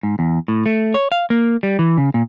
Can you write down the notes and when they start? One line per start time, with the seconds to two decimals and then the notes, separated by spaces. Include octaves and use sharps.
0.03 G#2
0.19 E2
0.48 A2
0.66 A3
0.94 C#5
1.12 F5
1.30 A#3
1.63 G3
1.79 E3
1.98 C#3
2.14 A#2